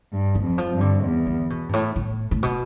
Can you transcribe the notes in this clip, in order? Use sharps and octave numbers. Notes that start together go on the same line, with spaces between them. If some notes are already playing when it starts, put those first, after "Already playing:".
G2
E3
F2
F3
G2
D3
E2
D3
B2
G2
A2
A2
A2
B2